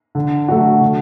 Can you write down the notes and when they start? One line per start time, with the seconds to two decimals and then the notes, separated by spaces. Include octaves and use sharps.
0.15 D3
0.48 F#3 A3 D4 F#4
0.81 D3